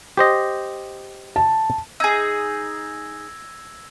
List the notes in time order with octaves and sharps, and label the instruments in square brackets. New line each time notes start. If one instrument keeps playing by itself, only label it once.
[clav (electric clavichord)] G4 C5 D#5
[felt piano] A5
[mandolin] D#4 G#4 [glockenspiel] E6 G#6 A#6